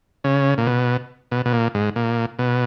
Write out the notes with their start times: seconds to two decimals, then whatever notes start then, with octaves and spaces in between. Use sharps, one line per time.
0.24 C#3
0.58 A#2
0.67 B2
1.31 B2
1.46 B2
1.53 A#2
1.75 G#2
1.96 A#2
2.39 B2